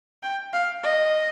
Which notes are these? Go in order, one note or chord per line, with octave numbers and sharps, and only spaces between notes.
G5
F5
D#5